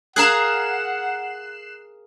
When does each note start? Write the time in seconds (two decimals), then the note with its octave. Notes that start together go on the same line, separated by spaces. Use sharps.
0.16 G#4 A#4 F5 F#5 F#6 C7 E7